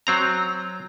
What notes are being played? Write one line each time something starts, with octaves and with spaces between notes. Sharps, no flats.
F#3 C4 A#5